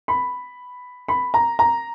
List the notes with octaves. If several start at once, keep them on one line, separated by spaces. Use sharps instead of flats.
B5
B5
A#5
A#5